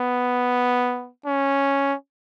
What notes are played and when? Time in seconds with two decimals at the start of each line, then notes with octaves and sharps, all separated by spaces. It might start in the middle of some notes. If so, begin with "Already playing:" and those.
Already playing: B3
1.26 C#4